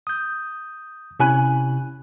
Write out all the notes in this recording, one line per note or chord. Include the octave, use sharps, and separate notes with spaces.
D#6 G6
C3 C#4 E4 G#5 B5 F#6